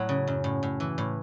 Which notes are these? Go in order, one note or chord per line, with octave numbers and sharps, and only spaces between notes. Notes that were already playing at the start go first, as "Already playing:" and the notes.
Already playing: A2 F#3
C#3
F#2
A2
A2
E3
A2